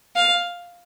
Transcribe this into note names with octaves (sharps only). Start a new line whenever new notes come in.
F5